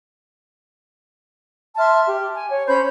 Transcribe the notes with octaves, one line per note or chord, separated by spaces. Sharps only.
E5 A5 C6 F6
G4
G#5
C#5
C#4 C5 B5 G6